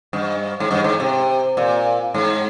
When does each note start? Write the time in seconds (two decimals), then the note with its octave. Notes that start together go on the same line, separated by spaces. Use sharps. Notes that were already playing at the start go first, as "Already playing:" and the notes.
0.13 G2
0.60 G#2
0.71 G2
0.84 G#2
1.00 C3
1.57 A#2
2.14 G#2